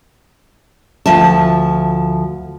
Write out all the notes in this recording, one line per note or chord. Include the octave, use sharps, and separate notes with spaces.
D2 F3 E5 A5